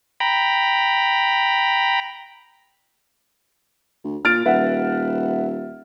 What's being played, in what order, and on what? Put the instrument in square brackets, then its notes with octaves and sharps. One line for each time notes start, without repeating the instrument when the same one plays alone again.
[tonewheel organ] G5 A#5 B5
[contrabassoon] D2
[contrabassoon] A#2 [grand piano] F6 A6 D7
[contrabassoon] D#1 [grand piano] B4 E5 F#5